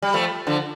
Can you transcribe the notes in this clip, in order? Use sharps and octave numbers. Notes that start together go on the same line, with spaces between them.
G3
F3 A3
D3 F3